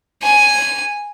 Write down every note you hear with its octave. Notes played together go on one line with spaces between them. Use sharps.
G#5